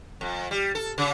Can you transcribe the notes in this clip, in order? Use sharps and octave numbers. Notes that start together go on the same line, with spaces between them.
F2
G3
A4
C#3